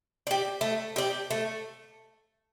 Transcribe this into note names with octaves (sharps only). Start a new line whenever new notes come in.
G4 D5
A3
G4 D5
A3